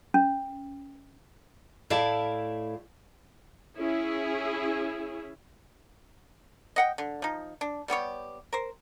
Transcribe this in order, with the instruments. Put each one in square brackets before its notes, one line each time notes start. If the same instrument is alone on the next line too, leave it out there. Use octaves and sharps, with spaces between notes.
[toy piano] C#4
[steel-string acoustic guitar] A2 E4 D5 F5 A5
[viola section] C#4 E4 G#4
[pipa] D#5 F#5 G5
D3
F3 D#4
D4
G3 B3 G4 C#5
A#4 C5